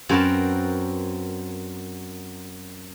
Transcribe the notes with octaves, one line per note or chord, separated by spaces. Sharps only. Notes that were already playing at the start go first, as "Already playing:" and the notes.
F#2 C4 F#4 A#4 B4 A5